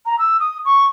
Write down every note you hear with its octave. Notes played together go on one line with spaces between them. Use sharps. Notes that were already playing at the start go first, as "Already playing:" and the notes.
A#5
E6
D#6
C#6